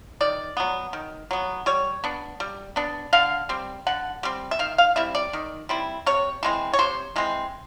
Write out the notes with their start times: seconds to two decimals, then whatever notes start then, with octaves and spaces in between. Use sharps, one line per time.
0.21 D#3 D5
0.57 F#3 B3
0.93 D#3
1.31 F#3 B3
1.66 G3 C#5
2.04 B3 D4
2.40 G3
2.76 B3 D4
3.13 D3 F5
3.49 G3 C4
3.87 D3 F#5
4.23 G3 C4
4.51 E5
4.59 D#3 F5
4.78 F5
4.96 G3 C4 E4 E5
5.15 D5
5.33 D#3
5.69 G3 C4 E4
6.06 C3 C#5
6.43 E3 G#3 C4
6.74 C#5
6.79 C3 C5
7.16 E3 G#3 C4